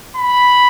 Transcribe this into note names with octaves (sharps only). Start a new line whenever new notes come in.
B5